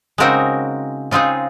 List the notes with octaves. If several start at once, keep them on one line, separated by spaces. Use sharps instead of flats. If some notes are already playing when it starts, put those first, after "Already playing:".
C#3 G#3 C4 D#4 F#4 A#4
C#3 G#3 C4 D#4 F4 G#4